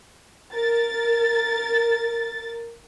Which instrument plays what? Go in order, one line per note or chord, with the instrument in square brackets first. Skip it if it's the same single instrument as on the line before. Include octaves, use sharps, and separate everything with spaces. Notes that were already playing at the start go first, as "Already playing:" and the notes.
[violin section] A#4 A6